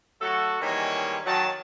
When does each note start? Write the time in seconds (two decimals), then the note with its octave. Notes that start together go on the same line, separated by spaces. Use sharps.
0.21 F#3 A3 F#4 A4
0.61 D#3 E3 G3 G#3 A#3 C#5
1.26 D#3 F#3 A5